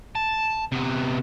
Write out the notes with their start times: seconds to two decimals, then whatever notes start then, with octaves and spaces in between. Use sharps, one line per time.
0.15 A5
0.72 C3 B3